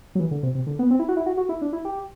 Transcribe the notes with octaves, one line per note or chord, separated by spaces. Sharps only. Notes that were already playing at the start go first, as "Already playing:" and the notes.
F#3
E3
D3
C3
C3
D3
B3
C4
E4
F#4
E4
F#4
F#4
E4
D4
E4
G4